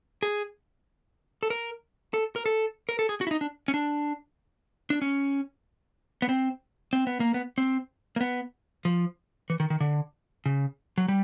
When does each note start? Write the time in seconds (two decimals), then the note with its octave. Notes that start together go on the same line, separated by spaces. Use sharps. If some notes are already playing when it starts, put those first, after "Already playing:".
0.23 G#4
1.43 A4
1.50 A#4
2.14 A4
2.36 A#4
2.46 A4
2.89 A#4
2.99 A4
3.09 G#4
3.21 F#4
3.27 E4
3.31 D#4
3.41 D4
3.68 C#4
3.74 D4
4.90 D4
5.02 C#4
6.22 B3
6.29 C4
6.93 C4
7.07 B3
7.20 A#3
7.34 B3
7.58 C4
8.16 A#3
8.21 B3
8.85 F3
9.50 E3
9.60 D#3
9.70 D#3
9.81 D3
10.46 C#3
10.98 F#3
11.08 G3